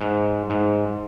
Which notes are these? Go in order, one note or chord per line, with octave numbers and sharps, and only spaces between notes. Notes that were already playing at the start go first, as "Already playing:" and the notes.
G#2
G#2